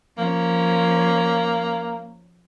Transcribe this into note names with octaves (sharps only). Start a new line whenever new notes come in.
F3 A#3 C#4